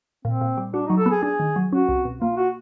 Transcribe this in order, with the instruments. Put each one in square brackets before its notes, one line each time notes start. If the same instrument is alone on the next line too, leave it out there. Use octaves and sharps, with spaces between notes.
[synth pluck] A#2 [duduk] C4
[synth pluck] A#2
G3
[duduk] D4 [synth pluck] F#4
[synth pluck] F#3 [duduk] D#4
[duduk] A4
[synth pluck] B3
[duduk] G#4
[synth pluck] D4 [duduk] G#4
[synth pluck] D#3
F#3
[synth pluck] C#4 [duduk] F#4
[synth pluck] C2
B2
[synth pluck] A#3 [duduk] F4
[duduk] F#4